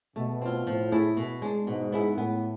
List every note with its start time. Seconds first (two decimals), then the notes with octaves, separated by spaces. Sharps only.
0.16 B2 A3
0.41 C4 F4
0.67 A2 F3
0.92 A3 E4 G#4
1.17 B2
1.42 G#3 D4
1.67 G#2 B2
1.92 B3 E4 G#4
2.17 A2 B3